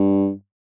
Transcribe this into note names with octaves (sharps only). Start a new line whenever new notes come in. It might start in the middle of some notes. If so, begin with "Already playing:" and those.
Already playing: G2